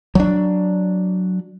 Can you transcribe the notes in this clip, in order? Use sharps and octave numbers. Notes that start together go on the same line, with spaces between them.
F#3 D4